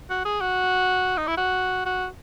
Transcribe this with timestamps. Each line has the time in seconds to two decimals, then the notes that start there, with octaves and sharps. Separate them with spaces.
0.10 F#4
0.25 G#4
0.41 F#4
1.17 D#4
1.27 E4
1.37 F#4
1.85 F#4